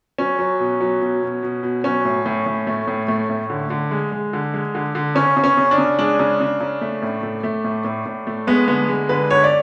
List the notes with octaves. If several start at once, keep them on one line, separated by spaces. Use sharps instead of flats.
F#3 C#4
F#3
B2
F#3
B2
B2
B2
B2
F#3 C#4
A2
A2
A2
A3
A2
A3
A2
D3
D3
G#3
G#3
D3
G#3
D3
D3
C#3 C#4
C#3
C#4
C#3
D4
C#3
G#3 D4
C#3
C#3
C#3
A3
A2
A3
A3
A2
A2
A2
A3
G#3 B3
D3 B3
G#3
D3 B4
D3 C#5
D5